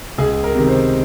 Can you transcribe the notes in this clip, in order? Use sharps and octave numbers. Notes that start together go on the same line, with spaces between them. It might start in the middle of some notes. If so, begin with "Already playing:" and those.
C#2 G#4
A#4
C3 D#3
C5